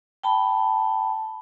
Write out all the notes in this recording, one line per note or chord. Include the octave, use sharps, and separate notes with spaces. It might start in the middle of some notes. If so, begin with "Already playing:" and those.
G5 A5 B5